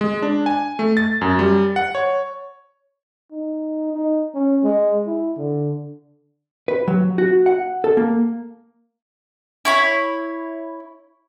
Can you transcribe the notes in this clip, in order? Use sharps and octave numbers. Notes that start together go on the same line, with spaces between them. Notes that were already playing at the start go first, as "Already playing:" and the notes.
G#3
D4
G#5
A3
A6
F#2
G3
F#5
C#5
D#4
D#4
C#4
G#3
E4
D3
B4
F#3
F#4
F#5
A4
A#3
E4 C#5 B5